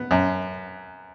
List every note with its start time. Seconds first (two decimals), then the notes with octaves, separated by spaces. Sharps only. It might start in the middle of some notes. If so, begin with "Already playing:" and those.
Already playing: B3
0.11 F#2